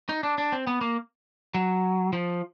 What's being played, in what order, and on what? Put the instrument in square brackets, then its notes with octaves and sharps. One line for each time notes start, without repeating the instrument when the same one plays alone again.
[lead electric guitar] D#4
D4
D4
C4
B3
A#3
F#3
F3